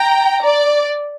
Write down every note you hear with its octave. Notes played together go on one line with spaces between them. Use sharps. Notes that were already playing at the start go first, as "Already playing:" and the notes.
Already playing: G5 A#5
D5